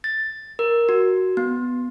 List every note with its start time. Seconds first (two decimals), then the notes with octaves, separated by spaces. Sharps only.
0.04 A6
0.59 A#4
0.89 F#4
1.37 B3